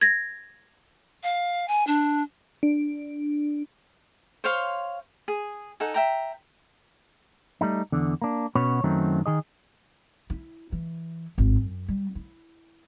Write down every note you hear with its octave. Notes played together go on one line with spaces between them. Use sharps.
G#6 A#6
F5
G#5
D4
D4
C5 C#5 F5 C6
G#4
D#4 A4 F#5 G#5
E5 G5 A#5
G3 A3 D#4
E2 D3
A#3 D4
B2 C#4 F#4 B4 C#5
F#2 D#3 F#3 A3 C4 D#4
D#3 G#4 D#5
E4
E3
G#1 A2
F#2
G3
E4